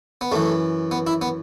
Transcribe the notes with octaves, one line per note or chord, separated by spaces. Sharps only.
B3
F#2 E3 A3
B3
E4
B3